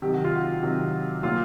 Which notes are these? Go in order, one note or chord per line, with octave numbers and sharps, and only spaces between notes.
C3 D#3 F#3 G4
F#4
F4
F#4
C3 D#3 F#3
A#2 F#3 F4